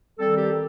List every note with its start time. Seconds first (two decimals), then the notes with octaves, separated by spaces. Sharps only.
0.19 D#3 G3 C4 A4
0.36 G4